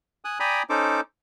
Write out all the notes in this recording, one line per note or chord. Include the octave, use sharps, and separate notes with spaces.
G#5 D#6 F#6
D5 G5 G#5 A#5 B5 D#6
C#4 D#4 A4 C5 D6